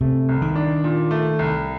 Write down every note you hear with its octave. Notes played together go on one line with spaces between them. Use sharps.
C3 A3
C2
D#3
D4
A#2
A3
C2